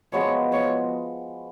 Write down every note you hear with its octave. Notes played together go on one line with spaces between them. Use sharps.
F3 G#3 B3 F#4 C#5
C#5